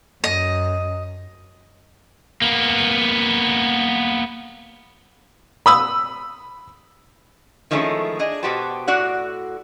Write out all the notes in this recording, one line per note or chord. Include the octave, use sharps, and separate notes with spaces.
F#2 D#5
A#3 B3
B5 D#6 E6
D#3 F3 G#3 A3 C#4 E4
D4 G#4 D#5
B2 B3 F#4 G4 C5 A5
A2 F#4 D5 F#5